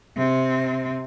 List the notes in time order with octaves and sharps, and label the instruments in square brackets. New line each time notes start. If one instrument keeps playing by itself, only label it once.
[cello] C3 C4